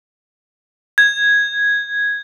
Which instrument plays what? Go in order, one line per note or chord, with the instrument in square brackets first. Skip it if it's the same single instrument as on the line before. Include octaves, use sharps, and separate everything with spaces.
[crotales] G#6